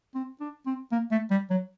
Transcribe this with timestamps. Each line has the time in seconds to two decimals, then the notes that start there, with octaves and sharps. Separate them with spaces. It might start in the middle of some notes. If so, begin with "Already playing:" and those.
0.15 C4
0.41 D4
0.66 C4
0.92 A#3
1.11 A3
1.31 G3
1.50 F#3